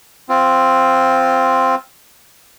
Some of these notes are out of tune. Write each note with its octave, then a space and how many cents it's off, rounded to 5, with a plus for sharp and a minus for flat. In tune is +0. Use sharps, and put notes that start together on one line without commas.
C4 +0 F4 +0